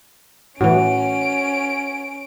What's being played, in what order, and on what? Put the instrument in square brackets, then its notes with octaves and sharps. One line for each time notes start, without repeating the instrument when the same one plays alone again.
[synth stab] A2 E3 [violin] C#4 D7 [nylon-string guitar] F#4